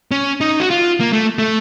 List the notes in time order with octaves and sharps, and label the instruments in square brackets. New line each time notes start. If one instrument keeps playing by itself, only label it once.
[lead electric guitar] C#4
D#4
F#4
F4
A#3
A3
A3